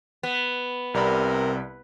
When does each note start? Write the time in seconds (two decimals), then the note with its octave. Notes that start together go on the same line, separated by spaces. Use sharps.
0.23 B3
0.94 C2 C3 A#4 D5 B5